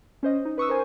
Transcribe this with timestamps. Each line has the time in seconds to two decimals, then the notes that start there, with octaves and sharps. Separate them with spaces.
0.23 C#4 C5 D#5
0.45 D#4
0.58 B4 C#6 D#6 E6
0.69 A#4 C5 G#5